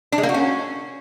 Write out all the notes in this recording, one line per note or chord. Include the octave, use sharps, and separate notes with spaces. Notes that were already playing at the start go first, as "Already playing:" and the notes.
D4
G#3
A#3
F#4
C#4